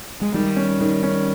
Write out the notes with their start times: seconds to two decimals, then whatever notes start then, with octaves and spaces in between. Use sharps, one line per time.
0.21 G#3
0.34 D#3 G3
0.56 C#4
0.81 D#3
1.03 C#4